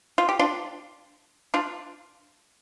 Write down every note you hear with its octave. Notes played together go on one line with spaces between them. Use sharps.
F4
G4
D4 F4
D4 F4